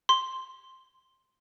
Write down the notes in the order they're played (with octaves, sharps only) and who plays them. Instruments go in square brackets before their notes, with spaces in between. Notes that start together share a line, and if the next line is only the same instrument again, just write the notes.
[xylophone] C6